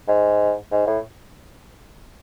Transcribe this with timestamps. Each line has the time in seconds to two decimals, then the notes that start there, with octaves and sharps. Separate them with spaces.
0.08 G#2
0.72 G#2
0.87 A2